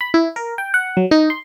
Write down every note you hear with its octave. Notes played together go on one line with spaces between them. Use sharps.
B5
E4
A#4
G5
F#5
F#3
D#4
C6